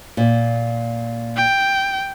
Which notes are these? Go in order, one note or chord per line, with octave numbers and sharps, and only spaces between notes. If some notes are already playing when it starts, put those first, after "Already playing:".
A#2
G5